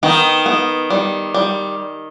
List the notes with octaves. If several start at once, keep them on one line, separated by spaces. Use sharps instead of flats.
D#3 B3
B3
G3
G3